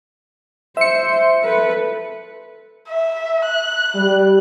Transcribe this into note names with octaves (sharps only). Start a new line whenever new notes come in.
C5 E5 C#7
A4 B4
E5
F#6
G3